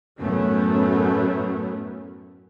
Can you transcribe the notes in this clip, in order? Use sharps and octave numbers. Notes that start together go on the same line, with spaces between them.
F#2 A2 F#3 A3 B3 C#4